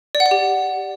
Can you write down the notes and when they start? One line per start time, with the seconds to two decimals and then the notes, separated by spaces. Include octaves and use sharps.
0.15 D5
0.20 F#5
0.26 D5
0.31 G4